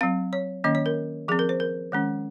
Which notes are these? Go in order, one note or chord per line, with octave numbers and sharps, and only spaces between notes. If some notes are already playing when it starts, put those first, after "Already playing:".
F#3 C4 F5
C#5
D#3 A#3 C#4 D#5
C#5
A#4
F3 C4 G#4
A#4
C5
A#4
D#3 G#3 C#4